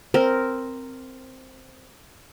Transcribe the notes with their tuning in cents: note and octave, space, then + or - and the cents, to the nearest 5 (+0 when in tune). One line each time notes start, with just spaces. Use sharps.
C4 +0 A#4 -5